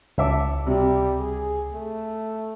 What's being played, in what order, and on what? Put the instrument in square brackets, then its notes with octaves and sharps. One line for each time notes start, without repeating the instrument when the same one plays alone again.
[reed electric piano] C#2 D6 [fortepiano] C#5 E5 A5
[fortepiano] C3 [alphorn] G3
[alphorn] G#4
A3